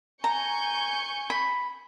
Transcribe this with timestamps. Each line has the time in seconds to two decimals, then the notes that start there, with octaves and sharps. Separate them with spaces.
0.24 G#5 A#5 C#6 G6
1.30 B5